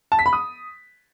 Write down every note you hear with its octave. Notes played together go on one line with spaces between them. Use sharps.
A5
B6
B5
D#6